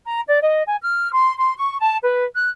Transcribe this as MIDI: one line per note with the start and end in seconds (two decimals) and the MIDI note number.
0.05 0.20 82
0.28 0.39 74
0.42 0.63 75
0.66 0.76 80
0.82 1.12 89
1.12 1.36 84
1.38 1.54 84
1.57 1.78 85
1.79 1.97 81
2.03 2.23 71
2.35 2.49 90